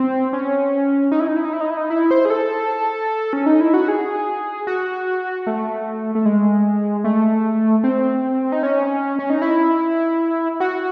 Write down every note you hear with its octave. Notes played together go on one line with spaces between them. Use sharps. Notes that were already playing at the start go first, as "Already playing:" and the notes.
Already playing: C4
C#4
D#4
E4
D#4
E4
D#4
E4
D#4
E4
D#4
E4
C5
G#4
A4
C#4
D#4
E4
F#4
G#4
F#4
A3
A3
G#3
A3
C4
D#4
C#4
C#4
D#4
E4
F#4